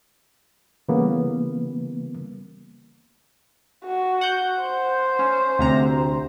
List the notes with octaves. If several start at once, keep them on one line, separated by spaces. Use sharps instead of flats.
C#3 E3 G3 A#3 B3
F#4
F#5 G6
C5
C#4
D2 C3 A#5